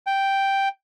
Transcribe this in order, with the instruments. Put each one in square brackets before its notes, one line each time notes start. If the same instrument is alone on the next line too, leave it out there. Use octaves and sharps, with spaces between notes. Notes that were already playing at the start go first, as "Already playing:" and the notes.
[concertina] G5